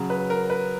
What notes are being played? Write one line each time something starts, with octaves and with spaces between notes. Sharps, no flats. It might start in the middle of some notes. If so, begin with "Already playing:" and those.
Already playing: C#3 F#3
B4
A#4
B4